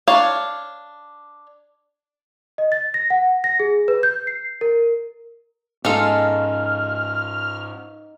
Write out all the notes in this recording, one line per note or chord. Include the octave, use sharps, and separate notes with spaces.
D4 C#5 F5
D#5
A6
A#6
F#5
A#6
G#4
B4
G6
C7
A#4
G#2 G#3 C#4 D#4 F4 A4 F6